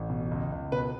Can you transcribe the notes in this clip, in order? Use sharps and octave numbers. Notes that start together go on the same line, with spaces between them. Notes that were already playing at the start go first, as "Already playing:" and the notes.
Already playing: A1
B2
C#2
C#2
B2 B4